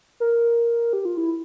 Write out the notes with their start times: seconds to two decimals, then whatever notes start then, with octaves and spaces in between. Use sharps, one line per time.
0.20 A#4
0.93 G4
1.05 F4
1.17 E4